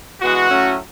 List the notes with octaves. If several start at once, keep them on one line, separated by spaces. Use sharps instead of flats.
E3 G#3 B3 F#4
A2 F#3 A3 C#4